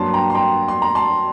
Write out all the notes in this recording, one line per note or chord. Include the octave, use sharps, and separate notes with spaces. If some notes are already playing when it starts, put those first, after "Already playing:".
Already playing: G2 F#3 A#3 A5 C6
G5 A#5
C6
G5 A#5
C6
A#5
A5 C6